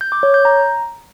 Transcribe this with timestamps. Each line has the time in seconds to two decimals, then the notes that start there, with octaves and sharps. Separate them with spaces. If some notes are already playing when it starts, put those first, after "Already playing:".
0.01 G6
0.12 D6
0.23 C#5
0.34 G6
0.45 A#5